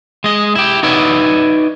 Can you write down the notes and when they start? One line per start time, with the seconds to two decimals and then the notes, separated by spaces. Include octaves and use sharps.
0.24 G#3 D#5
0.55 E4 G4
0.83 D#4 F#4 B4 C#5 D5 E5